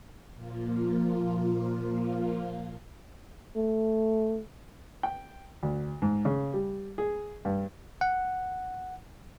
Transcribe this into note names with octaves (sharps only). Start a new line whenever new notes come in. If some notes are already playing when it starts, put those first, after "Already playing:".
A#2 F3 A#3 F4
A3
G5
D2
G#2
C#3
G3
G#4
G2
F#5